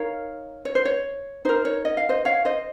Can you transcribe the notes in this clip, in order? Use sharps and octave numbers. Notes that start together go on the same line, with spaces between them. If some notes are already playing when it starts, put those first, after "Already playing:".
Already playing: D#4 A#4 C#5 F5
C#5
C5
C#5
D#4 A#4 C5
C#5
D#5
F5
C5 D#5
C#5 F5
C5 D#5